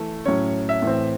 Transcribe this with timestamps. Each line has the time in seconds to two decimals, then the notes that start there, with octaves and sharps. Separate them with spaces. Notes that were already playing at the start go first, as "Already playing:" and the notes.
Already playing: E3 A3
0.26 A2 F#3 C#4 C#5
0.69 E5
0.82 A2 E3 C4